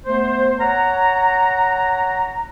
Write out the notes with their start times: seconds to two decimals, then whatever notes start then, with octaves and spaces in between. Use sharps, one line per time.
0.06 A3 B3 C5
0.60 C#5 F#5 A#5